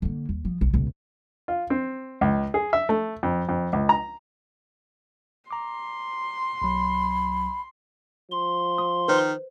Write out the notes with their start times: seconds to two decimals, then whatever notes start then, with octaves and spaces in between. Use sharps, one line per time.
0.02 D3 A#3
0.29 D#2
0.45 F3
0.61 B1
0.73 C#2 B2
1.48 F4
1.70 C4
2.21 C#2
2.54 G#4
2.73 E5
2.89 A3
3.23 F2
3.49 F2
3.73 C#2
3.89 A#5
5.51 A#5 C6 D6
6.62 B1 F#3 B5
8.32 F3 C6
8.78 D#6
9.08 D#3 B4 C5